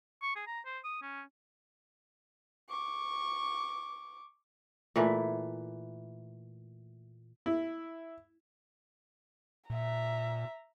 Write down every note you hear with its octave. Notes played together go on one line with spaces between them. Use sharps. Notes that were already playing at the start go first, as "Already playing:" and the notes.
C#6
G#4
A#5
C5
D#6
C#4
C#6 D6
A#2 E3 A3
E4
A#2 E5 A#5